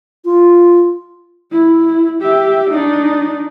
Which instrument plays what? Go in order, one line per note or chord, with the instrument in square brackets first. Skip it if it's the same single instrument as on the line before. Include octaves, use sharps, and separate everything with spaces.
[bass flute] F4
[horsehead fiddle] E4
G4 E5
D4 D#4